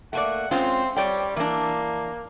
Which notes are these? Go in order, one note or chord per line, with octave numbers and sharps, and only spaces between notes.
A3 A#3 D5 F#5
G#3 C4 C#4 F4
G3 C#5 D5 G5
E3 A#3 D4